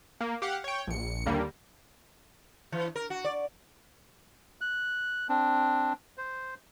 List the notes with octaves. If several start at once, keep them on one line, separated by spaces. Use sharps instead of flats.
A#3
G4 F5 F#5
C#5 G5
A#1 C#7
D#2 D3 G3 A#3
E3
A#4
F#4
D5
F#6
C4 D4
C5